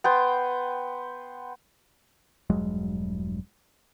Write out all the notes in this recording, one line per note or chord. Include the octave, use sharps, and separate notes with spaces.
B3 G5 C6
E1 G2 F#3 G#3